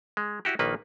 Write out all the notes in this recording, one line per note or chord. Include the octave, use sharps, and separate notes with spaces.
G#3
E4 F#4 G4
A#1 D#3 A#3 B4